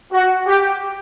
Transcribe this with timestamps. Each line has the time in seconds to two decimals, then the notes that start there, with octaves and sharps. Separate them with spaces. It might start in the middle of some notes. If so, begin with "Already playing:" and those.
0.13 F#4
0.47 G4